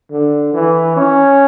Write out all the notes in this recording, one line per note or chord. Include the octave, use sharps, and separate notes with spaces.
D3
E3
C#4